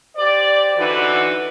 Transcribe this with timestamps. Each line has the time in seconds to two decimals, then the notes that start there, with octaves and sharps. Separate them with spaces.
0.17 G4 C5 D5
0.77 D3 E3 D#4 F#4 B4